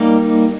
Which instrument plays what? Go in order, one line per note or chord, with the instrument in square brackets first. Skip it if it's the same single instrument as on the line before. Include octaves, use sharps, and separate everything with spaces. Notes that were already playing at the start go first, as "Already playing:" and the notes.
Already playing: [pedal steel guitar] G3 A#3 D#4